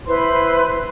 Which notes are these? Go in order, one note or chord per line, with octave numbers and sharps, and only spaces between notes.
E4 B4 C5 C6